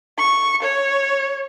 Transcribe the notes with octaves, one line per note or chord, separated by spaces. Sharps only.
C#6
C#5